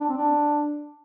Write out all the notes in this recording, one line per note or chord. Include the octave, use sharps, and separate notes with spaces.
D4
C4
D4